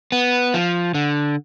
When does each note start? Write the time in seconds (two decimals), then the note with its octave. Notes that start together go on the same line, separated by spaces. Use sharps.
0.12 B3
0.54 F3
0.94 D3